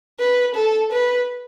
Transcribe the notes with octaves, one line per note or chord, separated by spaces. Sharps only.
B4
A4
B4